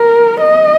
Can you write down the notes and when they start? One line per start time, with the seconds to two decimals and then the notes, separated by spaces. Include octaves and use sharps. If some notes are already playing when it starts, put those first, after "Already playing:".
Already playing: A#4
0.40 D#5